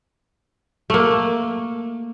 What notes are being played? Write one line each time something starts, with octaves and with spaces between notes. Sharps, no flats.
A3 A#3